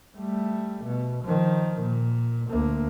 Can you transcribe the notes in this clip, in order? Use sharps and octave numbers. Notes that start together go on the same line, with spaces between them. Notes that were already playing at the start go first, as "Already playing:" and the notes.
G3 A3
B2
D#3 F3
A#2
D2 A#3